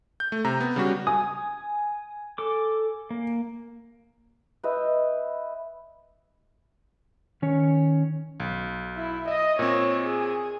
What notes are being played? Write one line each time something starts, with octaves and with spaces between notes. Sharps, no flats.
G6
A3
C3 A#5
B3
C#3 G3 F#4
G#5 D#6
A4 D6
A#3
B4 D#5 E5 G5
D#3 C#4 C#5
B1
E4
D#5 E5
A#2 C4 C#5
G#4